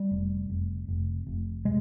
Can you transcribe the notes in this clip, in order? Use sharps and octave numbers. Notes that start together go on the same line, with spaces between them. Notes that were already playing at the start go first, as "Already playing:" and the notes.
Already playing: G3
F1
F1
F1
F1
C3 G#3